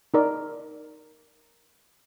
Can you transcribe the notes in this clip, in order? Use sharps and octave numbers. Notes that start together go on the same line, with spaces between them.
D#4 A#4 D5